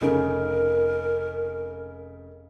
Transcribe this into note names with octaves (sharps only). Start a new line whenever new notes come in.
F1 C#3 D#4 A#4